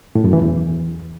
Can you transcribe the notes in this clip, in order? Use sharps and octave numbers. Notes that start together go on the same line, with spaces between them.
A2
F#2
E3
E2